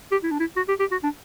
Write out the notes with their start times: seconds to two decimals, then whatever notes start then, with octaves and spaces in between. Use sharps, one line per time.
0.12 G4
0.23 E4
0.31 D4
0.40 E4
0.57 F#4
0.69 G4
0.80 G4
0.92 F#4
1.03 D4